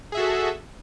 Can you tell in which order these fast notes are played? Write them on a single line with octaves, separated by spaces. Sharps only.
G#4 E5 F#4 A4